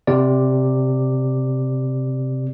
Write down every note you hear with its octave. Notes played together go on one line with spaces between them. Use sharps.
C3 D5